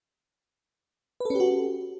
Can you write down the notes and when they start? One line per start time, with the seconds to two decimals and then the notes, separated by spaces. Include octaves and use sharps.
1.20 B4
1.25 A4
1.30 C#4
1.35 G4
1.40 F#4